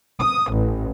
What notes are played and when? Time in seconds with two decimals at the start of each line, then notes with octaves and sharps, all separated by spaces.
0.20 D#6
0.53 A1